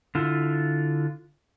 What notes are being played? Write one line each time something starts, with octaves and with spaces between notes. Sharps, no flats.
D3 E4 F4